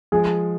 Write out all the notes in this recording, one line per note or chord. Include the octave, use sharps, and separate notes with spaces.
F3 G#3 G#4